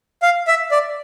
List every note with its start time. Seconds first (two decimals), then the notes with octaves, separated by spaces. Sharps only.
0.22 F5
0.47 E5
0.71 D5